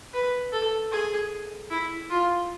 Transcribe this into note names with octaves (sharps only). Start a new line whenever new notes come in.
B4
A4
G#4
E4
F4